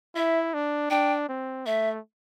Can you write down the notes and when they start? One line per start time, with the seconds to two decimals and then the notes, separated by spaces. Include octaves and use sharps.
0.15 E4 E5
0.54 D4
0.90 D4 G5
1.29 C4
1.66 A3 E5